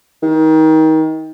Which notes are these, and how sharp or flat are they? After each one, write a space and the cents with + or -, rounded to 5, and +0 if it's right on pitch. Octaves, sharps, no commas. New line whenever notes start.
D#3 +25